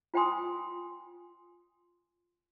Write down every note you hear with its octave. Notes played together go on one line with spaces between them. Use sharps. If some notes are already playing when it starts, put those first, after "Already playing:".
F4 C5 G5 G#5 C6 D#6